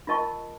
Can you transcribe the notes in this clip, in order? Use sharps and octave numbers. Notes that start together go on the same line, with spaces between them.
F4 A#4 D#5 A5 C#6